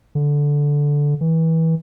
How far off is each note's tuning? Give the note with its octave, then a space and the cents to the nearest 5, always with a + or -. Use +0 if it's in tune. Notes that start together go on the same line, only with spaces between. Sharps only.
D3 -10
E3 -25